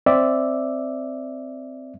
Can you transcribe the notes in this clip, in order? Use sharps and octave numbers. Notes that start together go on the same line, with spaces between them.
C4 D5 E5